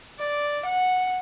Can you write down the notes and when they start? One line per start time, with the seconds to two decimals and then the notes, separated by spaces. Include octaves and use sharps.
0.20 D5
0.66 F#5